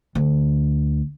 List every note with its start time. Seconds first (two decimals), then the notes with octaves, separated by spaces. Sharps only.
0.15 D2